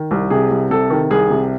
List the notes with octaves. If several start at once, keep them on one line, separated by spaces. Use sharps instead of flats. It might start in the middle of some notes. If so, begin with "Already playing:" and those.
Already playing: D#3
C2
C3 G#4
C2
C3 A4
D#3
C2 G#4
C3